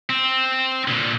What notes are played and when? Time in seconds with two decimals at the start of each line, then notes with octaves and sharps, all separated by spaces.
0.09 C4
0.88 A#2 D3